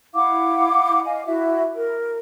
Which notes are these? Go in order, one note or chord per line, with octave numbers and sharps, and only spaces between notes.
E4 F5 F#5 D6
D#5 F5 G#5
E4 F#4 E5
A#4